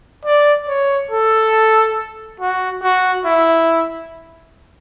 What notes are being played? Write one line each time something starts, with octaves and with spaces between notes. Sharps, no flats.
D5
C#5
A4
F#4
F#4
E4